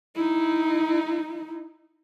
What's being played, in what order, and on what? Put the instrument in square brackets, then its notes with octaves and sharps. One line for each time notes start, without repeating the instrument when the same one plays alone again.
[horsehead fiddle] D#4 E4